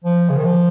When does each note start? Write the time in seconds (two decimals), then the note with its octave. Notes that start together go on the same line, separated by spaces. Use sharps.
0.05 F3
0.30 C#3
0.37 D#3
0.45 F3